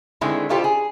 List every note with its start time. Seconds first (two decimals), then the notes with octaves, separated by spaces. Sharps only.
0.21 D3 D#3 G#3 A3 C4 E4
0.49 B2 E4 F4 G4 A4 C5
0.64 G#4